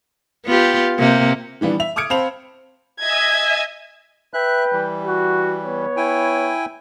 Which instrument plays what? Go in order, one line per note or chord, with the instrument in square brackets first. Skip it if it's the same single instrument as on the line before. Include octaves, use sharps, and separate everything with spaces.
[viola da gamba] B3 F4 G4
C3 A#3
[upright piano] D#3 E3 G3 B3 D4
E5 F7
D6 D#6 F6 G#6 C#7 D7
C4 C5 F5 A5 B5 F7
[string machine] D#5 E5 G#5 [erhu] G#6
[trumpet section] B4 G5 [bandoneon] E5 F#6
[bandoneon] E3 G3
[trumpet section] F#4
B3 C#5
[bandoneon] E4 G5 G#5